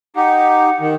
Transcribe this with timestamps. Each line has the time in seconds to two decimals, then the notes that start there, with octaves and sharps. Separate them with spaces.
0.16 D#4 G4 F#5
0.80 D#3